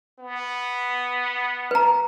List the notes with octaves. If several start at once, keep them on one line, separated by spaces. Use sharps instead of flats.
B3
B4 A#5